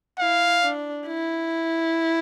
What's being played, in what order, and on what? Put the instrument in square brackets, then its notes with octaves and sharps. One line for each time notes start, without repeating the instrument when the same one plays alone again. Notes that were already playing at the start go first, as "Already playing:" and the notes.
[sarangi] E4 [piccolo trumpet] F5
[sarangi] D4
E4